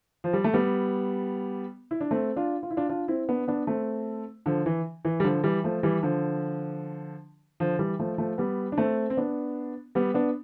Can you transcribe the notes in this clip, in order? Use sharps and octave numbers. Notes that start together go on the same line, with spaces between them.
F3
G3
A3
G3 B3
E4
D4
A3 C4
D4 F4
F4
E4
D4 F4
D4 F4
C4 E4
B3 D4
B3 D4
A3 C4
D3 F3
E3
E3
G3
D3 F3
E3 G3
F3 A3
E3 G3
D3 F3
D3 F3
E3 G3
F3 A3
F3 A3
G3 B3
D4
A3 C4
C4
B3 D4
G3 B3
B3 D4